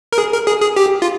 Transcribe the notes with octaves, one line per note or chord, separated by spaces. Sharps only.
A#4
G#4
A#4
G#4
G#4
G4
F4